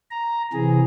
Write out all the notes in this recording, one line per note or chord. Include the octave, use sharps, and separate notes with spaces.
A#5
C3 E3 G#4